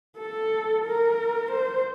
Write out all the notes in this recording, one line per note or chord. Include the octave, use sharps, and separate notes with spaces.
A4
A#4
C5